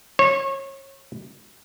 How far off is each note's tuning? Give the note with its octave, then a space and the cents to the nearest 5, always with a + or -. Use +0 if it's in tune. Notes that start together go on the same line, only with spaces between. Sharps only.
C#5 -30